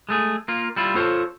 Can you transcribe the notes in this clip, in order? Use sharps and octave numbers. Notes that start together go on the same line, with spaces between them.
G#3 A3 G#4
A#3 F4
G3 E4 F4
F4 A4 C5 C#5